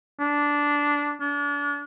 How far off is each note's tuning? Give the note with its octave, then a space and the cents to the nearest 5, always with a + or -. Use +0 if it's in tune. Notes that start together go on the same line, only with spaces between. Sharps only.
D4 -10
D4 -35